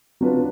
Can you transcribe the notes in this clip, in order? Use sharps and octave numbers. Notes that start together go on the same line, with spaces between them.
F#3 D4 F4 B4